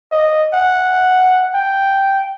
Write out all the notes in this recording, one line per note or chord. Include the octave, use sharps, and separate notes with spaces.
D#5
F#5
G5